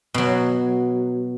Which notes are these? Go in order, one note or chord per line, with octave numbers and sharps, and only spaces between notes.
B2 F#3